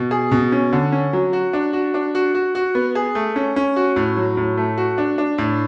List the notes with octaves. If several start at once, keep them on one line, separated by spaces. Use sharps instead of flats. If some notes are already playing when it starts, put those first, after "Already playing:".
Already playing: B2
G#4
B2
C#4
D3
C#4
F#3
F#4
D4
F#4
D4
F#4
F#4
F#4
B3
G#4
A3
C#4
C#4
F#4
A2
F#3
A2
A3
F#4
D4
D4
A2